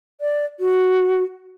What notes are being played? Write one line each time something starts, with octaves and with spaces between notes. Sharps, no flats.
D5
F#4